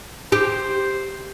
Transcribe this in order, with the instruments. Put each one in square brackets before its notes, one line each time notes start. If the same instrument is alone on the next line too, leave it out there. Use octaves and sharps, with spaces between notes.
[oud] G4 [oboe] C5